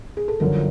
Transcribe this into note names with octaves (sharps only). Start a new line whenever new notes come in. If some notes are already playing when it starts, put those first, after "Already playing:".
G#4
A4
G1 F#2 D3 F3 A#4